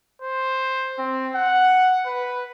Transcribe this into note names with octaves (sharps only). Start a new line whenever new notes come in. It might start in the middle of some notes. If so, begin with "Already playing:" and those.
C5
C4
F#5
B4